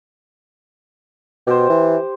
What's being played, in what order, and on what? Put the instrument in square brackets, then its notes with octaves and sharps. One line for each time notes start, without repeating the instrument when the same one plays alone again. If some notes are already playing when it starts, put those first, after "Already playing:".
[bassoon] B2 [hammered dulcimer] G4 C5
[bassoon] E3